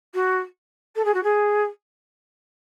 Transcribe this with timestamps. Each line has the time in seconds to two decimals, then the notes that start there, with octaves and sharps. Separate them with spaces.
0.14 F#4
0.95 A4
1.04 G#4
1.14 F#4
1.23 G#4